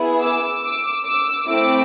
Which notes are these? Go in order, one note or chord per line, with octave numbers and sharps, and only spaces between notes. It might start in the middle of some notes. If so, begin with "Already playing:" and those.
Already playing: B3 E4 G#4
D6 E6
D6 E6
D6 E6
A3 C4 E4 D6 E6